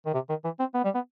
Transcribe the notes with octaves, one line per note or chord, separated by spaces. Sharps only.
D#3
C3
D#3
E3
C4
B3
G3
B3